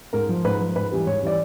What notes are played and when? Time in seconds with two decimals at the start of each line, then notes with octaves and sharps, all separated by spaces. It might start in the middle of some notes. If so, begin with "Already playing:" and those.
0.13 G#2 A#4
0.29 F3
0.44 G#2 B4
0.61 F3
0.75 G#2 B4
0.91 E3 G3
1.06 G#2 C#5
1.23 E3 G3 D5